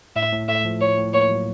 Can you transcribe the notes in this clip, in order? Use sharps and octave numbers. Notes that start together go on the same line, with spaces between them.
A2 E5
A2
A3 E5
F3
A2 C#5
A2
A#3 C#5
F#3